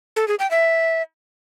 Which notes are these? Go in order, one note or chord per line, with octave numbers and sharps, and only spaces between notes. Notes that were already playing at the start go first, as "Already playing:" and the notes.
A4
G#4
G5
E5